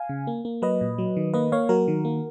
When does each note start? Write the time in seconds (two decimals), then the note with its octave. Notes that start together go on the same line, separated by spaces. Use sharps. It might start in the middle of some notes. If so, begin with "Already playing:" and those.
Already playing: F5 G#5
0.09 C#3
0.27 A#3
0.45 A#3
0.62 F#3 B4 D#5
0.81 A#2
0.98 F#3
1.17 D#3
1.34 A#3 B4 D#5
1.52 A#3 C#5 F5
1.69 F#3 F#4 A#4
1.88 D#3
2.05 A#3